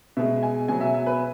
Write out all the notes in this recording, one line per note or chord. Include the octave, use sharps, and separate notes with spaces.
B2 G#3 E5
G#5
B2 F#3 G#5
E5
E5
B4